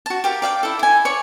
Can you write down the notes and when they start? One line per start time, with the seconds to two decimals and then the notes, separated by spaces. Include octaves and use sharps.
0.06 F#4 A5
0.24 G4 A#4 F5
0.42 D5 F5 G5
0.63 E4 A4
0.79 E4 G#5
1.05 C#5 D5 C#6